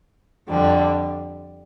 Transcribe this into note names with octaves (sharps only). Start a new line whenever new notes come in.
F2 D3 G3